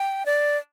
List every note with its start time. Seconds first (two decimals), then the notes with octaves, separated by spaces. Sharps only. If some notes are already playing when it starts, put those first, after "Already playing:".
Already playing: G5
0.26 D5